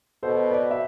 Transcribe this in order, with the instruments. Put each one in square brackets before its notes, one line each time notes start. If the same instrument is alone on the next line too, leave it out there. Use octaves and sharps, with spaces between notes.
[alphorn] B2 [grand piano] A4 C5
[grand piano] B4 D5
E5